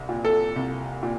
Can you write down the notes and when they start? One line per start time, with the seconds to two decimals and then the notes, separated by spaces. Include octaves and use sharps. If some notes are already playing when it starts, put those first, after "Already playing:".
Already playing: C2
0.09 A#2
0.25 A4
0.56 C2
1.03 A#2